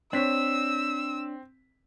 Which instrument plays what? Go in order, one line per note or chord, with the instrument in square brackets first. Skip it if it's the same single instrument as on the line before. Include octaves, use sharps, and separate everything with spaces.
[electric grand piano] C4 B6 [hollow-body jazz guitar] D4 C#5 [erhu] E6